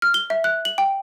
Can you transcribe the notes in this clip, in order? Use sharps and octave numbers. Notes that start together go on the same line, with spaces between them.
F6
G7
E5
F#6
F#7
G5